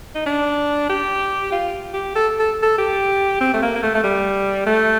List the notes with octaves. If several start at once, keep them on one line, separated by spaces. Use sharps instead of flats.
D#4
D4
G4
F4
G4
A4
A4
A4
G4
C4
A3
A#3
A#3
A3
A3
G3
A3